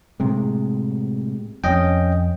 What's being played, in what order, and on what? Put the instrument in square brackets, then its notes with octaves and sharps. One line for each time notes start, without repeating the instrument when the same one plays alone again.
[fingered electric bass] A2 C3 G#3
[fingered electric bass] F2 [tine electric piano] C#4 D#5 G5